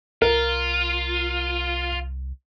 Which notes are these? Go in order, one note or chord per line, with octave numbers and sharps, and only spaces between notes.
C2 F4 A#4